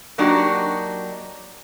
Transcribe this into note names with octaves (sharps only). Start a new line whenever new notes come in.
F#3 A#3 D4 D#4 F#4 G4